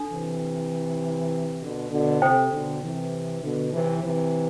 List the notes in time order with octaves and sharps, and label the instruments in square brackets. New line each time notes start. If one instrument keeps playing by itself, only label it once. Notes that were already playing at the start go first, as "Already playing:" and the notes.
Already playing: [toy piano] D4 A4
[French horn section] C3 E3
B2 D3
B2 D3
[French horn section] C3 [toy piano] A4 C5 G5
[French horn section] B2 D3
C3 E3
B2 D3
C3 E3
C3 E3